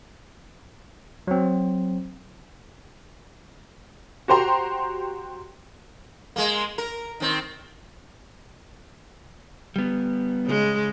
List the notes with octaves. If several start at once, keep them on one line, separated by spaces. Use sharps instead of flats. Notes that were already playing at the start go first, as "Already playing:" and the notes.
F#3 C4
F#4 G4 C5 G5 A#5 C6
G#3 A#3
A#4
D#3 C4
G3 B3
C#3 G#3